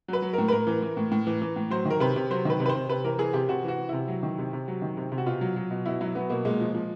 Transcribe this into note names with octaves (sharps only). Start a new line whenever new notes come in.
F#3 B4
F#3
A2 A#4
B4
A2 A#4
E3
E3
A2
A2
E3
E3
A2
F#3 C5
D#3
A#4
C3 B4
C3
F#3 C5
D#3 B4
C3
B4
C5
C3
C3 B4
E3 A#4
E3 G#4
C3 G4
C3 F#4
E3 F#4
E3
C3 E4
F#3
D#3
C3
C3
F#3
D#3
C3
C3
F#4
B2 F4
F#3
F#3
B2
B2 E4
F#3 E4
F#3 B3
B2 A#3
A#2 G#3
F3
F3